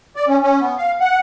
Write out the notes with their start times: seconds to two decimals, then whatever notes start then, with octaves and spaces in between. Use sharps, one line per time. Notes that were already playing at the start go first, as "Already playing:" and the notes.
0.16 D5
0.28 C#4
0.43 C#4
0.61 B3
0.78 F5
1.00 F#5